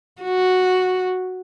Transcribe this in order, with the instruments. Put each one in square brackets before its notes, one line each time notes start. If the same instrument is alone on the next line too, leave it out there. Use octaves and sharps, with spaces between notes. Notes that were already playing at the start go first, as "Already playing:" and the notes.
[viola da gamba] F#4